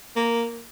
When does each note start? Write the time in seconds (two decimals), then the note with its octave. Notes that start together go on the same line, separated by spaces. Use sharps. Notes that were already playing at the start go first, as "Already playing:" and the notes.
0.16 A#3